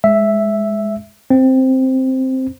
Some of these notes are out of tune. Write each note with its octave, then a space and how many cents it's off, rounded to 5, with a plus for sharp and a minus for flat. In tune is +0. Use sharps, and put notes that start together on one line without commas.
G#3 +0 E5 +0
C4 +0 C5 +0